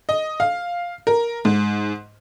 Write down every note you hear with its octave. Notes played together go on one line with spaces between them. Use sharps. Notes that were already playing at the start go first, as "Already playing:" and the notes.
D#5
F5
A#4
G#2